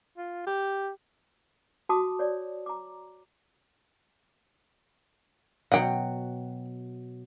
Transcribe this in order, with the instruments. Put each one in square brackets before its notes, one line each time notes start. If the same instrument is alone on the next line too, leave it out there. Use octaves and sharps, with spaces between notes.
[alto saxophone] F4
G4
[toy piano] F#4 A5 C6 D6 D#6
C#5 D5
A#5 D6
[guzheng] B2 F#3 [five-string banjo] F#5 G5